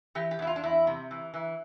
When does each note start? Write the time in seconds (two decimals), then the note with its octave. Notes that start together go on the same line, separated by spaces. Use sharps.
0.15 E3 G4
0.31 G4
0.39 E2 E4
0.47 F4
0.56 D4
0.63 E2 E4
0.87 C3
1.11 E3
1.34 E3